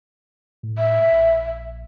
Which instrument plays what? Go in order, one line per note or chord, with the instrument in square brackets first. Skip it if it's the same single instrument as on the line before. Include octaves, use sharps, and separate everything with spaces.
[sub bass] A2
[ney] E5
[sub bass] A#1